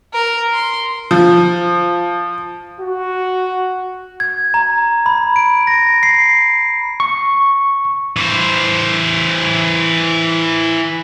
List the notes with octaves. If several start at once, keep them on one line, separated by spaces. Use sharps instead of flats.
A#4
C6
F3
F#4
G#6
A#5
B5
D7
A#6
C7
C#6
E3 C5